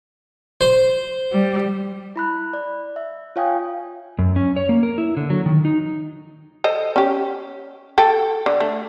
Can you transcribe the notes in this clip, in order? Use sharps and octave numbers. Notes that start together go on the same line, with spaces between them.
C5
G3
E4 B5 F#6
D5
E5
F4 C#5 F5 G5 G#5 D#6
F#2
C#4
C#5
A#3
A#4
E4
D3
F#3
D#3
D#4
A4 C5 D#5
C#4 G4
A4 G5
D3
A3